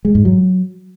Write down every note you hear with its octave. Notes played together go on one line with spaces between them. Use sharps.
G#3
G#2
F#3